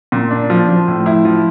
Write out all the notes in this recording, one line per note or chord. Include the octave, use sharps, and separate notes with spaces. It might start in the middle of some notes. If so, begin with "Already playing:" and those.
A#2
D4
F3
F3
A2
E4
F3